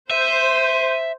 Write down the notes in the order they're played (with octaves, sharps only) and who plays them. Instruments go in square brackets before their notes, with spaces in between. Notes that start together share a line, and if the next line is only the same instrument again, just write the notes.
[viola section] C5 [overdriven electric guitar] E5 [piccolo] D#7